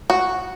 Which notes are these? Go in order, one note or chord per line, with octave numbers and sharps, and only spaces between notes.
F#4